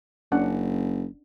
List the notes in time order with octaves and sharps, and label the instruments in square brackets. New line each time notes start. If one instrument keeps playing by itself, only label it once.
[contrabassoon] F#1 [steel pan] C#4 D4 F#5